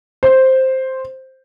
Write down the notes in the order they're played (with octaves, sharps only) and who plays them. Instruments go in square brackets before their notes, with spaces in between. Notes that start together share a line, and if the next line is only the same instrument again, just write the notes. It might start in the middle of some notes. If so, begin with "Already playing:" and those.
[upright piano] C5